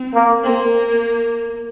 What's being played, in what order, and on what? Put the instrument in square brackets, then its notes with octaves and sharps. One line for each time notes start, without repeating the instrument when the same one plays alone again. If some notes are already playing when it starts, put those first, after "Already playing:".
Already playing: [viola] C4
[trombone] A#3
[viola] A#3 [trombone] C4